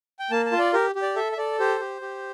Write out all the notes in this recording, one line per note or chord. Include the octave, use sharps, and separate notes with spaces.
G5
A#3 A5
A5
F4
D5
G4 A#4
G4
D5
A4 E5
E5
A4 D5
G4 C5
G4
G4